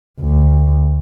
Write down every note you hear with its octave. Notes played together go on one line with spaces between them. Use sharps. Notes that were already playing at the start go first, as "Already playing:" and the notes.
D2